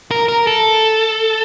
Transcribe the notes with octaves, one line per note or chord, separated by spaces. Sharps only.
A#4
A#4
A4